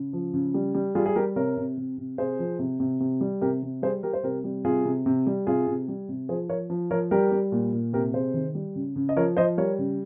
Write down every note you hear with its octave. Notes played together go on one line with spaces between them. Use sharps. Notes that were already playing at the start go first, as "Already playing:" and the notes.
Already playing: C#3
F3
C#3
G3
G3
G3 F4 G#4
G#4
G3 G4 A#4
C3 A#4 C#5
C3
C3
C3
C3 G#4 C5
F3
C3
C3
C3
G3
C3 G4 A#4
C3
G3 G#4 C5
G3 G4 A#4
C5
C3 G4 A#4
G3
C3 F4 G#4
C3
C3
G3
C3 F4 G#4
C3
G3
C3
F3 G#4 C5
F3 A#4 C#5
F3
F3 A#4 C#5
G3 G4 A#4
G3
A#2
A#2
C3 G4 A#4
C3 G#4 C5
D#3
G3
C#3
C#3
D#5
F3 A#4 C#5
F3 C5 D#5
G3 A#4 C#5
C#3